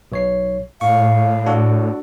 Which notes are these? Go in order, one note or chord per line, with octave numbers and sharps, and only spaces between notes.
B1 C#5 C7
A2 F5 C#6
D4 F#4 A4